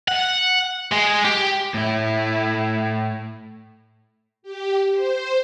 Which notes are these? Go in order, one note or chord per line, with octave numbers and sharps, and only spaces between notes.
F#5
G#3
G4
A2 E4
G4
C5